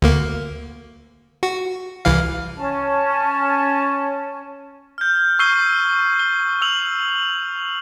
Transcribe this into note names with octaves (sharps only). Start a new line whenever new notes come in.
D2 A#3
F#4
C2 E3 F5
C#4 A5
F6 G6
C#6 E6 G6 C7 D#7 G7
G7
E6 F7 F#7